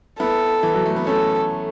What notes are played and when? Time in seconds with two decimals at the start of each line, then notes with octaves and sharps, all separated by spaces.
0.19 B3 E4 A4
0.63 E3
0.74 F#3
0.86 A3
0.96 B3
1.07 A3 C#4 A4